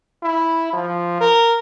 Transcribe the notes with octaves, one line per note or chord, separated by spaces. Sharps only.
E4
F3
A#4